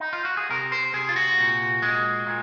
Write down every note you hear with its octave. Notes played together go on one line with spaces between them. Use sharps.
D#4
F4
F#4
G#4
C3 A#4
C5
C3 G#4
F4
F#4
A#2
G#3
A#2